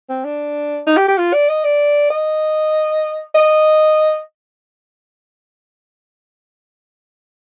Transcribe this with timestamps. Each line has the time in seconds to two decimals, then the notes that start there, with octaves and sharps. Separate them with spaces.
0.09 C4
0.25 D4
0.87 D#4
0.97 G4
1.08 G4
1.18 F4
1.33 D5
1.49 D#5
1.64 D5
2.10 D#5
3.35 D#5